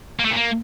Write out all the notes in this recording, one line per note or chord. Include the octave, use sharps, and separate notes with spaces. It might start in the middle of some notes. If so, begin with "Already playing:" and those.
A#3
A3
A#2
A#3